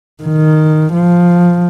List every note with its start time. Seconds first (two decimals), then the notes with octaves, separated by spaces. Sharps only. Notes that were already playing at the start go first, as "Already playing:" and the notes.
0.23 D#3
0.93 F3